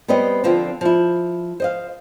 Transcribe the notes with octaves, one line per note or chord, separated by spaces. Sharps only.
G3 B3 C4 C#5 D#5
D3 F3 C4 F4
F3 E4
C5 D#5 F5